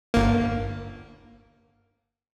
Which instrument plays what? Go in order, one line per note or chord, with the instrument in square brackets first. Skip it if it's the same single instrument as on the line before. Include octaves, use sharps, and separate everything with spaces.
[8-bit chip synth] G1 A#3